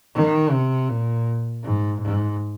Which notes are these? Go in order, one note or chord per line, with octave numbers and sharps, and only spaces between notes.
D#3
C3
A#2
G#2
G#2